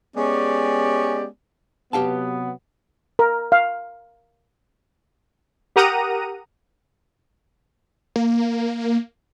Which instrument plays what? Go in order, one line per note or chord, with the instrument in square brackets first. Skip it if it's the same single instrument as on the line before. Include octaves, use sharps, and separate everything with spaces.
[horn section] G#3 B3 C#4 G4 D5
[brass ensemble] C3 F#3 B3 [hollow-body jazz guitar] G4 F5 A5
[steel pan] A#4
F5
[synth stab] G4 A#4 F#5 A#5 D#6 D#7
[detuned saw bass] A#3